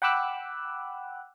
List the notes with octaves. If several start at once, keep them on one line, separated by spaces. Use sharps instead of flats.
F#5 G5 B5 D6 E6 F#6